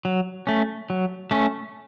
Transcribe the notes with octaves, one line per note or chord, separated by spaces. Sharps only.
F#3
A3 C#4
F#3
A3 C#4